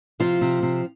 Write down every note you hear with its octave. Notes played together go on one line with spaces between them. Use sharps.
C3 F3 F4
C3
C3